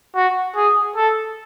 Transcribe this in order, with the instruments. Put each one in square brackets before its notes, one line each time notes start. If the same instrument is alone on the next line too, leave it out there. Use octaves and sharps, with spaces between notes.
[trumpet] F#4
G#4
A4